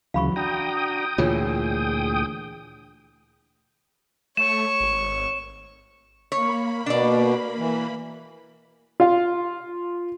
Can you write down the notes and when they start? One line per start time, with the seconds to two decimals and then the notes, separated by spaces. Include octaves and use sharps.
0.14 D2 C#3 E3 F#3 F5 B5 C#6
0.36 D4 F#4 G5 A#5 D#6
1.18 D2 A#2 E3 F4 G#4 C#5
4.37 A3 C#5 C#6 E7
4.80 G#1
6.32 A#3 C#5 B5
6.86 B2 D4 D5
7.59 E3
9.00 F4 F5